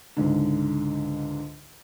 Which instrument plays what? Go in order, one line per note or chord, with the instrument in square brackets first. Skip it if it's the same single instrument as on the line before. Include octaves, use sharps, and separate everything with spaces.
[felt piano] C#2 G#2 D3